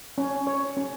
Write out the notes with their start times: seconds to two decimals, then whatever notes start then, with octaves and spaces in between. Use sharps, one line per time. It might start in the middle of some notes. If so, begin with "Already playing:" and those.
0.18 C#4
0.47 C#5
0.77 C#4